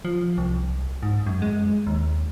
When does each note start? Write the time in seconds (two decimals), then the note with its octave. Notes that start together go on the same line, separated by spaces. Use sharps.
0.05 F3
0.38 C2
1.03 G#2
1.27 F#2
1.42 G#3
1.87 D#2